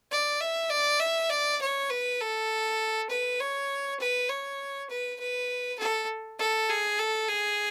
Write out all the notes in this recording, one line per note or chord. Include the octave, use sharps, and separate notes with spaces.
D5
E5
D5
E5
D5
C#5
B4
A4
B4
C#5
B4
C#5
B4
B4
A4
A4
G#4
A4
G#4